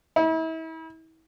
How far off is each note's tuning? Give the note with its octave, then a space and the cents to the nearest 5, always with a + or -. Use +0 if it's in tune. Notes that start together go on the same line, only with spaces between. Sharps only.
E4 -40